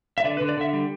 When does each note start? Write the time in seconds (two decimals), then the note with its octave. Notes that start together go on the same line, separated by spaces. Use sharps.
0.18 E5
0.24 D3 D5
0.37 B4
0.41 D3
0.49 D5
0.57 D3 E5
0.73 G3